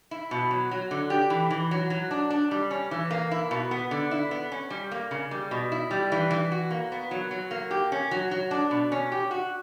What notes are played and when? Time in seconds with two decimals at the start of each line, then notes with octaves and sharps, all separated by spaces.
0.11 E4
0.31 B2
0.51 F#3
0.71 F#3
0.91 D3
1.10 G4
1.30 E3
1.51 E3
1.71 F#3
1.90 F#3
2.11 D4
2.31 D4
2.51 G3
2.71 C#4
2.91 E3
3.11 A#3
3.31 E4
3.51 B2
3.71 B3
3.91 D3
4.11 E4
4.31 B3
4.52 C#4
4.70 G3
4.92 A#3
5.11 C#3
5.31 G3
5.51 B2
5.72 E4
5.91 G3
6.12 E3
6.31 E3
6.52 F#4
6.71 A#3
6.92 B3
7.11 F#3
7.31 F#3
7.51 A#3
7.71 G4
7.92 C#4
8.11 F#3
8.31 F#3
8.51 D4
8.71 B2
8.92 C#4
9.12 G4
9.31 F#4